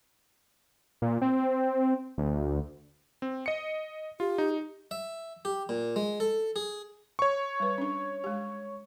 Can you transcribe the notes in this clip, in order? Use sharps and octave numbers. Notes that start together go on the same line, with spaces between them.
A#2
C4
D2
C4
D#5 C#7
F4 G4
D#4
E5
G4
A#2
G#3
A4
G#4
C#5 C#6
G3 B4
C#4 D4
G#3 G4